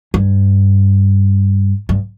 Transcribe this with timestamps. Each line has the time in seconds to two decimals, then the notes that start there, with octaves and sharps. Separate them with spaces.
0.14 G2
1.89 G2